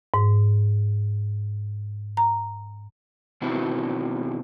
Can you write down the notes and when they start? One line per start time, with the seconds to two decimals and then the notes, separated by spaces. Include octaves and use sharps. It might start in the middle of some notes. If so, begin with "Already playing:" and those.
0.14 G#2
2.17 A#5
3.42 B2 D#3 C4 E4 F#4